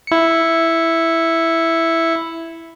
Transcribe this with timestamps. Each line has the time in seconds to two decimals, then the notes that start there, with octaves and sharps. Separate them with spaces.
0.07 E4 C#7